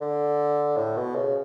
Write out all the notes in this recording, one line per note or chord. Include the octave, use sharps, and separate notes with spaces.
D3
A2
B2
C#3